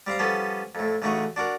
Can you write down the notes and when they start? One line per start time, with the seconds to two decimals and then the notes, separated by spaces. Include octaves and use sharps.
0.07 G3 C4 F5 A#5
0.19 F3 G3 B3 C#4 A4
0.75 F2 A2
1.02 A1 C#3 A3 D#4 F#4 C#6
1.36 D4 F#4 A#4